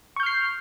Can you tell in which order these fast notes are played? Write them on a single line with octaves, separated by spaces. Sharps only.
C#6 G6 F6 C7